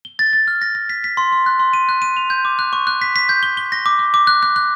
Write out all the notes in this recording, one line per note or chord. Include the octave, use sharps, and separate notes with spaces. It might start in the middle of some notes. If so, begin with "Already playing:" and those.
G7
A6
A6
F6
A#6
A#6
B6
B6
C6
C6
F#6
C6
D#7
F#6
D#7
F7
G6
D6
F#6
C#6
F#6
B6
B6
G6
G7
G7
A#6
D6
D6
D6
F#6
F#6
F#6